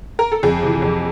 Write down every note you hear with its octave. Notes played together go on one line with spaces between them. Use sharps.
A#4
A4
F2 G#4
C3 E3
F2